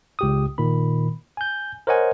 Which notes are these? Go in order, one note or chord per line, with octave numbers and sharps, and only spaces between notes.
C#2 G4 D#6
A#2 D#3 B5
G#5 G6
A#4 C5 C#5 D#5 F#5 G#5